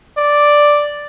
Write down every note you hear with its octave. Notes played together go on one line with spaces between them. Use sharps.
D5